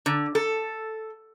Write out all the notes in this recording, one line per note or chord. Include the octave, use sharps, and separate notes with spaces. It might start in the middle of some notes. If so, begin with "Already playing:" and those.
D3
A4